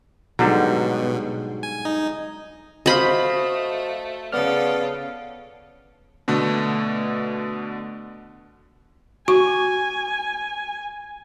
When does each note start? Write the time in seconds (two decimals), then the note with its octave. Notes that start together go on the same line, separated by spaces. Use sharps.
0.39 G#2 B2 D3 F#3 G3
1.63 G#5
1.85 D#4
2.86 A3 F#4 C5 D#5 F5 B5
4.32 C#3 B3 F4 A4 D5 F6
6.28 B2 D3 A3
9.28 F#4 G#5 C#6